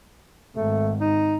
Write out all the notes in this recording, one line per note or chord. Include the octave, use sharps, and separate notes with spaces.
G#1 A3
D#4